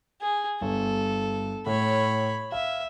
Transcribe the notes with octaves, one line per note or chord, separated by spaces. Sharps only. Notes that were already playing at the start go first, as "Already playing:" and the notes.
G#4
G1 A4
A2 C#5 B5
E5 F5